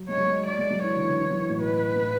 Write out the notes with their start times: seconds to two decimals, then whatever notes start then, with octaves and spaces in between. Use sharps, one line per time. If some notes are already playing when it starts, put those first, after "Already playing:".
Already playing: F#3
0.08 G#3 C#5
0.17 F#3
0.26 G#3
0.47 D5
0.59 G#3
0.70 F#3
0.83 E3 C#5
0.96 D3
1.03 E3
1.08 D3
1.21 E3
1.30 F#3
1.40 E3
1.49 A2
1.59 B2 B4
1.96 A2